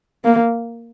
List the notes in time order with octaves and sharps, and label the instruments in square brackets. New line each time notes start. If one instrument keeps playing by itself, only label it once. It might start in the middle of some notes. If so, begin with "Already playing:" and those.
[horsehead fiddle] A#3